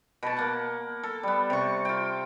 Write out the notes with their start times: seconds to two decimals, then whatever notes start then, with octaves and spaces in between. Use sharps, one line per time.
0.23 B2 A5
0.37 A#3 F#5
1.03 A4
1.23 G3 B3
1.50 C3 C#6
1.85 F4 G5